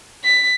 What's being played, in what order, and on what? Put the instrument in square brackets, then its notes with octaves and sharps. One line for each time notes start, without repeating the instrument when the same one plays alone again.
[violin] B6